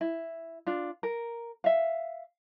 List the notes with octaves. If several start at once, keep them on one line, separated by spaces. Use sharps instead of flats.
E4
D4 F4
A#4
E5 F5